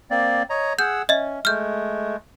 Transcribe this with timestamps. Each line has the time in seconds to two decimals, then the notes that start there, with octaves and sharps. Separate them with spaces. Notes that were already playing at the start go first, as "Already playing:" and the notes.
0.11 A#3 C4 D5
0.50 C#5 D#5 A#5
0.79 G#4 F#5 E6 G6
1.09 C#4 D#5 E5
1.45 G#3 A3 F6 G6